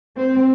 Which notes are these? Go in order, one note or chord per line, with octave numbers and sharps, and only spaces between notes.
C4